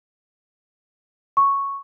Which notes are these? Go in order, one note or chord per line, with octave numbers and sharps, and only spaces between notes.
C#6